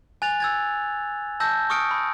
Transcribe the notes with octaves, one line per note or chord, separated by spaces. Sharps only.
G#5 F#6 A6 F7
E6 G#6 A6
A5 E6 G6 A#6
C#6 D#6 F6 C#7 D7
B5